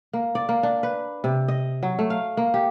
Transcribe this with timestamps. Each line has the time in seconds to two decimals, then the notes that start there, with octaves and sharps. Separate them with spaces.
0.13 A#3
0.35 D5
0.49 A#3
0.63 D4
0.83 B4
1.24 C3
1.48 D#5
1.83 F#3
1.99 A3
2.10 F5
2.37 A#3
2.54 G4